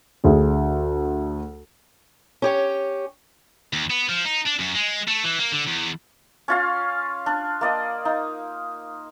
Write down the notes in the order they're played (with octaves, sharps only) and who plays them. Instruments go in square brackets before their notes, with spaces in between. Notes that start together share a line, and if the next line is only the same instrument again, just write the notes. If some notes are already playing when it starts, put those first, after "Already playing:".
[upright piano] D2 D4 G#4
[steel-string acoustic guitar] C#4 G4 C#5
[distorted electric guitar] D#2
B3
F3
D#4
D4
F#2
G#3
A3
E3
A#3
D3
E2
[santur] C#4 F4 F5
D4
A#3 D5 D#5
D#4